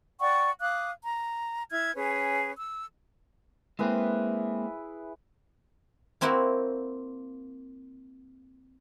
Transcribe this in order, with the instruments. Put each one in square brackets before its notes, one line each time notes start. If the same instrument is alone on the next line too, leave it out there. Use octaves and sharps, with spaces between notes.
[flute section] D5 F#5 G5 C#6
F5 D6 D#6 F#6
A#5
E4 F6 G#6
C#4 G#4 B4
E6
[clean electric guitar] G#3 A#3 C4 [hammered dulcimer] E4 G#4 B4
[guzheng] A#3 C4 E4 F#4 A#4